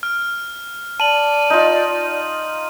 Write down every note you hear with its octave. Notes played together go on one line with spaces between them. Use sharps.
F6
D5 A5 D#7 F#7
D#4 F4